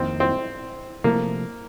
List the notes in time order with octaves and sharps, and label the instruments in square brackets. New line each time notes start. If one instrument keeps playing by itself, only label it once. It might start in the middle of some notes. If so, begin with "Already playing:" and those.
Already playing: [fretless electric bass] F2 D#3 A#3 [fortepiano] C4
[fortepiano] C4
[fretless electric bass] C3 F3 A3 [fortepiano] A#3